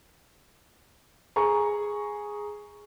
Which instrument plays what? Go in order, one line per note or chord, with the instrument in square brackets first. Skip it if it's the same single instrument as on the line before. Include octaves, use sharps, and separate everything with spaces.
[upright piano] G#4 A#5 C#6